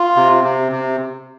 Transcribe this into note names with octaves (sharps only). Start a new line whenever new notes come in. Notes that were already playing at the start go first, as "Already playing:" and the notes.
Already playing: F4
C3
C3
C3